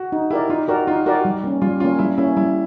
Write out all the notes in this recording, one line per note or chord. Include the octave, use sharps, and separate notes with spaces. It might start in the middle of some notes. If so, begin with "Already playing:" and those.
Already playing: F#4
D#4
E4 G4 A#4 D5
D#4 F4
F#4 G4 A#4 D5
D#4 F4
F#4 G4 A#4 D5
G3
A#3 C#4
G3 F4
A#3 C#4 F4
G3 E4
A#3 C#4 E4
G3 E4